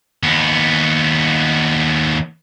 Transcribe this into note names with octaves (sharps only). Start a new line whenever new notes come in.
D#2 B3